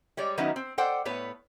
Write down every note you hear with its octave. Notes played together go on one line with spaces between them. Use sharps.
G3 G#3 C#5 D5
D#3 F#3 B3 C#4 D#4 E4
C4
A4 C5 D5 F#5 G5
A2 B3 B4 C#5